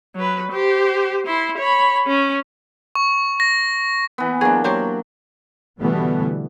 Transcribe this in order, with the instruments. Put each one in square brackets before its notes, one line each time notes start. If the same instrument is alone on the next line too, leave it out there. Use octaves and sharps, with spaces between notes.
[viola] F#3 B4
G4 C5
E4 C6
C#5 B5
C#4
[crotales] C#6
A#6
[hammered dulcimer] E3 B3
[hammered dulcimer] F#3 A#3 D4 [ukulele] G#4
[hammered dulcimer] F#3 [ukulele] G4 C5 C#5
[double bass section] B2 D3 E3 G3 A3 B3